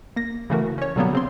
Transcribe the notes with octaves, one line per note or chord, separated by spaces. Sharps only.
A#3 A#6
C#3 E3 A3 F#4 A#4
C#4 C#5
B2 D3 F#3 G3 A#3 B3
C#3 C4 C6